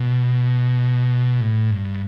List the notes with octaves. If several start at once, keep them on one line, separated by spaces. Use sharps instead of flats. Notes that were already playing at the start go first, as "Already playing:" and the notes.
Already playing: B2
A2
G2